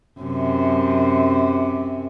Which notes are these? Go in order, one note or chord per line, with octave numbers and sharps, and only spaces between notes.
F#2 C3